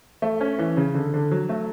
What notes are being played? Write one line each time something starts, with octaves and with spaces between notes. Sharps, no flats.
A3
C#4
E3
C#3
D3
D3
F#3
A3